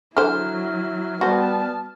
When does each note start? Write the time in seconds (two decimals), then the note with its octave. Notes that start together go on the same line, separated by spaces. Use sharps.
0.17 D3 F#3 E4 C5 F6
1.21 G3 B3 F#4 C5 A5